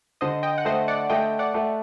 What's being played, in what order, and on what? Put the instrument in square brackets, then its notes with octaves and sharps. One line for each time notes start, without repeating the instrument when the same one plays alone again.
[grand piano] D3 [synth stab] C5 D#5
[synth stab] D#5 G5
F#5
[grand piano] A3 [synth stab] C5 D#5
[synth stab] D5 F#5
[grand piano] A3 [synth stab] D#5 G5
[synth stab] D5 F#5
[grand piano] A3